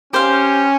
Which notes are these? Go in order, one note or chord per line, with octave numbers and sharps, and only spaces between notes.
C#4 G4 C5 F5